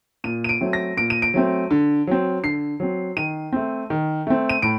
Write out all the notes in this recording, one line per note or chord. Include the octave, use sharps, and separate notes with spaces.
A#2 D#7
D#7
D7
F#3 A3 C4
A#6
A#2 D7
D#7
D7
F#3 A3 C4
D3
F#3 C4
D3 C7
F#3 C4
D#3 D#7
A3 C4
D#3
A3 C4
D#7
A2 D7